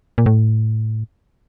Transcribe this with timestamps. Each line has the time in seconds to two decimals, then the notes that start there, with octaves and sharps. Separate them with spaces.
0.18 A#2
0.26 A2